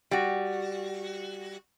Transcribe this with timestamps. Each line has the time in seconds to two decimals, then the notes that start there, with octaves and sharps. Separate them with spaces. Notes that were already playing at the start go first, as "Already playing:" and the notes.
0.11 G3 F#4